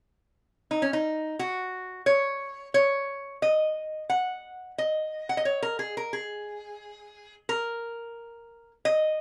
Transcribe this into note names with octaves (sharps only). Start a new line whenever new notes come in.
D#4
C#4
D#4
F#4
C#5
C#5
D#5
F#5
D#5
F#5
D#5
C#5
A#4
G#4
A#4
G#4
A#4
D#5